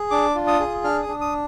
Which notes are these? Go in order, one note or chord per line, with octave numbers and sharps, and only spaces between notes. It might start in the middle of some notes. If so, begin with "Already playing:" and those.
Already playing: G#4
D4 D6
F4
D#6
G#4
D4 F6
D#6
D4
D#6